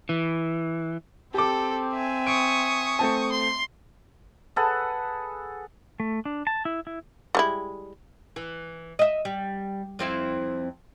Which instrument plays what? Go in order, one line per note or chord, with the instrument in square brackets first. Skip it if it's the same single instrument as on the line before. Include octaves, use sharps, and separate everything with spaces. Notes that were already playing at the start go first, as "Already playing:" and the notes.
[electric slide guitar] E3
[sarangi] C4 [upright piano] G4 D6 [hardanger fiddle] A4
[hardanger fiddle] E5 G#5
[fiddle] C#6 D#6 [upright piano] D7
[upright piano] A3 C4 A5
[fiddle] C6
[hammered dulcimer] G#4 A4 B4 F#5
[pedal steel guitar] A3
D4
A5
E4
E4
[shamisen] G3 G#3 E4
[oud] E3
D#5 E5
G3
F2 C4 E4